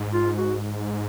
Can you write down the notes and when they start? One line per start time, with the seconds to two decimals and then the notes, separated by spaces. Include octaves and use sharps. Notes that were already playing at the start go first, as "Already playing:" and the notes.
Already playing: G#2
0.13 F4
0.38 F#4